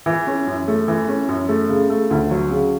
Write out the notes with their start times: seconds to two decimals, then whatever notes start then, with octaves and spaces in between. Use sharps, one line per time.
0.06 E3
0.27 C#4
0.47 F#2
0.68 A3
0.88 E3
1.08 C#4
1.29 F#2
1.49 A3
1.69 C#3
1.90 A3
2.11 D2
2.31 F#3
2.51 C#3